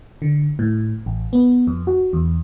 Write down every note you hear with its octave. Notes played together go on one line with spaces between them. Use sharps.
D3
A2
A1
B3
F2
F#4
E2